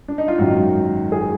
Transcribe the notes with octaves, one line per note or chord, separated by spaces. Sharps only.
D4
D#4
F4
G#1 F#2 D#3 F#4
G#4